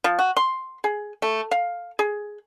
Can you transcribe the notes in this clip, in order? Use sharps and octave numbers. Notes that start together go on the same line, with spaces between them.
F3
F#4
C6
G#4
A3
F5
G#4